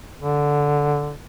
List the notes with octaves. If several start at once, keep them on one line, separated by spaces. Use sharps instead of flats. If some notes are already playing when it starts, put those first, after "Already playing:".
D3